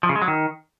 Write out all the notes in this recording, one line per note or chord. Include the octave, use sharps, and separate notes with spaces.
F3
C#3
G#3
F#3
D#3